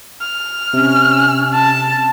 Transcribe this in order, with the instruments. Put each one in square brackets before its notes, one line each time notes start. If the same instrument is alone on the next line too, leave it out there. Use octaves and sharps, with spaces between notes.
[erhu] F6
[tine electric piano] C3 [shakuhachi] C#4
[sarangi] A5